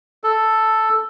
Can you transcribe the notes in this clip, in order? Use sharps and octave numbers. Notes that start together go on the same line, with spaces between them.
A4